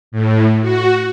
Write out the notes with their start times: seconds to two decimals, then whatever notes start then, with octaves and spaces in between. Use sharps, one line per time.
0.12 A2
0.61 F#4